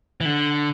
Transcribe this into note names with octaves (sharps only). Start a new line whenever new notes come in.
E3
D3